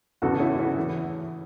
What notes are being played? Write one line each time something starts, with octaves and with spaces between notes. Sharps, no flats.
E2 C#3 F#3 F#4 A4
C#4 E4
C#4 E4
C#3 E3